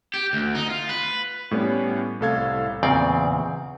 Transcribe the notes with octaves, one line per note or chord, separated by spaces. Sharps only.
G4
D2
D#4
F4
B4
A2 G3 B3 C#4
C2 A2 A4 F5 G#6
E2 A#2 C#3 C4 D5